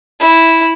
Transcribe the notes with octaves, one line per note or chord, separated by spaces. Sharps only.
E4